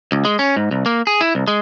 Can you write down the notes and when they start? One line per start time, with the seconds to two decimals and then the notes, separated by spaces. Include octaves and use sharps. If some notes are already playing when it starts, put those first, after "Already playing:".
0.12 C#2
0.25 G#3
0.39 C#4
0.56 G#2
0.71 C2
0.86 A#3
1.07 G#4
1.21 E4
1.35 C2
1.48 G#3